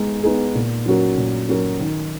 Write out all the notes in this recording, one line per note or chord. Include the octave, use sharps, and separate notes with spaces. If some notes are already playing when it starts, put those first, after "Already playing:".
Already playing: G#3 B3 D#4
B3 D#4 G#4
A#2
F#3 C#4 F#4 A#4
A#2
F#3 C#4 F#4 A#4
D#3